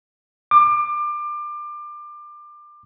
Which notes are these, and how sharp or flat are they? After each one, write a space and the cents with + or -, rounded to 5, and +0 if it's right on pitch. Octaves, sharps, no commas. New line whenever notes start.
D6 +25